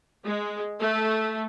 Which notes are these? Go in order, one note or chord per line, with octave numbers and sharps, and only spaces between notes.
G#3
A3